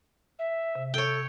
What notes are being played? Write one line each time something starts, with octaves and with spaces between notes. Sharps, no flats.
E5
C3
A4 C#5 G5